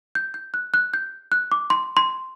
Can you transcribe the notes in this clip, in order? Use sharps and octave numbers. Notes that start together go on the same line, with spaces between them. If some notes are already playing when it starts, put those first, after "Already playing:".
G6
G6
F#6
F#6
G6
F#6
D6
C6
C6